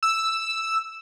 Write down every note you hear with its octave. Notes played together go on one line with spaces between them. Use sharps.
E6